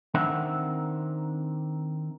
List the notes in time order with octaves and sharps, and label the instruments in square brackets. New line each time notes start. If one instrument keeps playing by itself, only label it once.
[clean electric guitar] D#3 C4 D4 A#4 E5 F#5